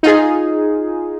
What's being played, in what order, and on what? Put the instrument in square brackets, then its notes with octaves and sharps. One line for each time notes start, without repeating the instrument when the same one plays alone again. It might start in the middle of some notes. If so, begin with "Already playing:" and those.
[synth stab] D#4 F4 G#4